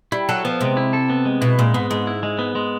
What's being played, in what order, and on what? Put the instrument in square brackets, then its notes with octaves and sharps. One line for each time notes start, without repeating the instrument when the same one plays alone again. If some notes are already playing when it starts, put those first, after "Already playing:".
[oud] G3 [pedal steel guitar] E4
[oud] F#3 [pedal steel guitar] A4
[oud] F3 [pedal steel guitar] B3
[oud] C3 [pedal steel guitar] G#3
[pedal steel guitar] E4
A4
B3
G#3
[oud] B2 [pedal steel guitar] E4
[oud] A#2 [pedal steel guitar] G#3
[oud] G#2 [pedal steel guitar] B3
[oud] G#2 [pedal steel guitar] G#3
[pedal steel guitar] E4
G#3
B3
G#3